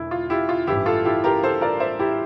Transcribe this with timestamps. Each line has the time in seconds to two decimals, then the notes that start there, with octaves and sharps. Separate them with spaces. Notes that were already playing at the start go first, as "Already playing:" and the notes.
Already playing: E1 E2 D3 E4
0.11 F4
0.30 E4 G4
0.49 F4
0.67 A1 G2 E3 E4 G4
0.86 F4 A4
1.05 E4 G4
1.24 G4 A#4
1.43 A4 C5
1.61 A#4 D5
1.80 C5 E5
1.99 E4 G4